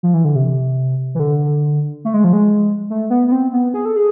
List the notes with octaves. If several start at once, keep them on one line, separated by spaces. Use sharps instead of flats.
F3
E3
D3
C3
E3
D3
A3
G#3
F3
G#3
A3
B3
B3
C4
B3
G#4
A4
G#4